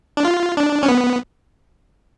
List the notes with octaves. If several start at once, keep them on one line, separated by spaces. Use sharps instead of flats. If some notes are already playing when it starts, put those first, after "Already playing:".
D4
F4
D4
C#4
B3